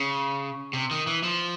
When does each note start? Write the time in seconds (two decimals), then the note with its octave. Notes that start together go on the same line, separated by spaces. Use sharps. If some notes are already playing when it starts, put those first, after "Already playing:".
Already playing: C#3
0.73 C3
0.91 D#3
1.07 E3
1.23 F3